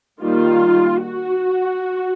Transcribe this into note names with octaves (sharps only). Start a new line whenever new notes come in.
D#3 G3 A#3 F4
F#4